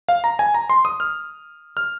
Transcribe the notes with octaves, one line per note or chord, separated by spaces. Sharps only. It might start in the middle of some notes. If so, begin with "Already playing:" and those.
F5
A#5
G#5
A#5
C6
D#6
F6
F6